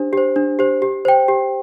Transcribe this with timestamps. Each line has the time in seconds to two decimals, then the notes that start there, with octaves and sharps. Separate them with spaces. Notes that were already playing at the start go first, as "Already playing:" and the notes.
Already playing: D4 G4 C5
0.13 G4 C5
0.36 D4
0.59 G4 C5
0.82 G4
1.05 C5 G5
1.28 G4